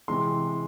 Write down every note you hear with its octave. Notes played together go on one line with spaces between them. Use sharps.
C3 E3 G#3 C6